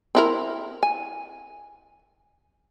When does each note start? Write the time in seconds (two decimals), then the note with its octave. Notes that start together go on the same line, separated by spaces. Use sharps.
0.15 C4 E4 A#4
0.83 G#5